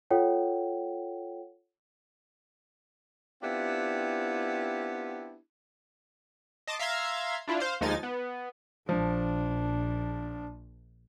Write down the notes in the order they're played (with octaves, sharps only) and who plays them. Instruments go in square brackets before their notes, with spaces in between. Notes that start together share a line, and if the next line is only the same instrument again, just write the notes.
[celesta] F4 A4 C#5 F#5 G5
[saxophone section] B3 C4 D4 E4 F4 G4
[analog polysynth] D#5 A5 C6 D6
E5 F5 A#5 C6 G#6
D4 E4 F4
C5 F5
D#2 F3 G#3 D#4 G#5 A6
B3
[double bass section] A#1 [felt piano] F3 [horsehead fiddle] D4